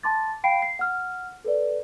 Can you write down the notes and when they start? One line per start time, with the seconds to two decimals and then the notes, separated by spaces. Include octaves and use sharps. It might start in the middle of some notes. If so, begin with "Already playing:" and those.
0.03 A5 C6 D6 A6
0.44 F5 G5 B5 C7 D7
0.62 C7
0.79 F#5 F6
1.45 A4 B4 D5